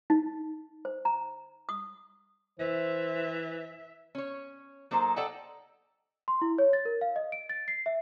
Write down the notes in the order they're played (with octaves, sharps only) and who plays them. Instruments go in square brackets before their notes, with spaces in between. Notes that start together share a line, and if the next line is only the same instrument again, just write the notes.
[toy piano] D#4
C5
A#5
D#6
[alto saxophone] E3 [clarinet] C5 [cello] E5
[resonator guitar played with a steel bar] C#4 C#5
F#3 A#3 D#4 A4 C5
A4 D5 D#5 F#5 G5 A5
[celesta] C6
E4
C#5
A6
A#4
F5
D#5
D7
A6
C7
E5